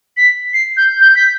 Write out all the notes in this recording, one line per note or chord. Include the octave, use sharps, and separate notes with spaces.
B6
C7
G6
G6
B6